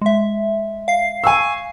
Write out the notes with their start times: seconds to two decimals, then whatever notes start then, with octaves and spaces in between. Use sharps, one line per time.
0.01 G#3 E5
0.88 F5 C7
1.24 G#5 C#6 E6